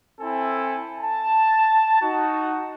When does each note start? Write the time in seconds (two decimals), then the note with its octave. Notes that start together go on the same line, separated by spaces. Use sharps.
0.21 C4 E4 A4 G#5
0.99 A5
2.02 D#4 F#4